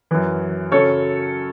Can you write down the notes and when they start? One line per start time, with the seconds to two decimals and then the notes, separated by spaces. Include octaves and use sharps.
0.11 F#2 E3
0.72 F#2 C#3 F#3 A4 C#5